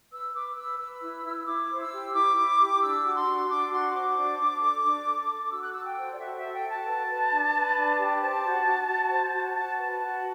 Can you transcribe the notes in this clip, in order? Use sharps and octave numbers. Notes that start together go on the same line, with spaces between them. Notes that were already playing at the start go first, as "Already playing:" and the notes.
B4 E6
B4 D6
B4 E6
B4 E6
E4
E4
E4 D6
C5
E6
G4
E4 D6
E4
G4
D4 E6
F#4
C6
D4
D4 D6
F#4 C6
C5 D6
D4
D4
A4
D4
A4
A4
F#4 E6
F#6
A4 E6
G5
C5
D5
F#4 E5
A4 E5
G5
F#4 A5
B4
B4
D4
B4
D4
G4
C5 A5
F#4
F#4
F#4
C5
F#4
F#4 A5
B4 A5
F#4 A5